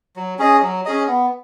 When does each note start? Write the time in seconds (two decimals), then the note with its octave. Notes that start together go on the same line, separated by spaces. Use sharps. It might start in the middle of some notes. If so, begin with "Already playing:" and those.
0.16 F#3
0.39 C#4 G#4 D#5
0.62 F#3
0.85 C#4 G#4 D#5
1.08 B3